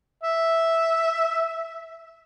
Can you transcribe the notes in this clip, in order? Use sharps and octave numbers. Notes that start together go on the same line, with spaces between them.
E5